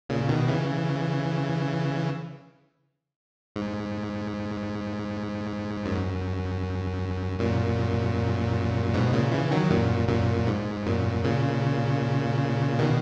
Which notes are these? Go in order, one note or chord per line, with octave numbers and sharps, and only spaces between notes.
A#2 C#3
B2 D#3
C#3 E3
G#2
F#2
F#2 A#2
G#2 B2
A#2 C#3
C#3 E3
D#3 F#3
F#2 A#2
F#2 A#2
G#2
F#2 A#2
A#2 C#3
B2 D#3